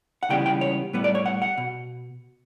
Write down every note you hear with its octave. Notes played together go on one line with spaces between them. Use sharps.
F#5
C#2 C#3 E3 G3 B3 G5
G5
C#5
A2 G3 B3 B4
D5
C#5
F#5
F#5
B2